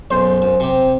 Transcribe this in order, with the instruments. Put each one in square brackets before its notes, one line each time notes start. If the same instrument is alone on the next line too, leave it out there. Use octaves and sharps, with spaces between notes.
[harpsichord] B1 F#2 [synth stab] C5
[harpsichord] F#2
C3 G4